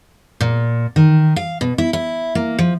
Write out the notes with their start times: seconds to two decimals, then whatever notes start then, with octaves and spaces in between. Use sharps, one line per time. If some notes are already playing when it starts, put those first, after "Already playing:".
0.41 A#2
0.96 D#3
1.36 F5
1.61 B2
1.78 E4
1.93 E4
2.35 A#3
2.59 F3